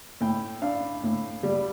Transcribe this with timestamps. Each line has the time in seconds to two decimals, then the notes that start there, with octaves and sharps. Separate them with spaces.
0.21 A2 G5
0.62 D4 F5
1.03 A2
1.43 G3